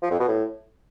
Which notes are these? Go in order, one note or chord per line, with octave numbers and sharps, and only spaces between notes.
F3
F2
B2
A2